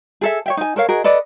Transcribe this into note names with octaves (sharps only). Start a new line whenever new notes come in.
G#4 A4 E5
C#5 E5 G5
D#4 G#5
A4 A#4 C#5 F5
F#4 G#4 A#4 D#5
A4 B4 D5 D#5